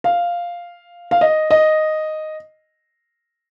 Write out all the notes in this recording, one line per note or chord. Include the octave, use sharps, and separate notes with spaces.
F5
F5
D#5
D#5